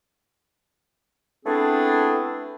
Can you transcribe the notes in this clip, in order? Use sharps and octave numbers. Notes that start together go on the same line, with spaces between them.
A3 B3 C4 D4 E4 G#4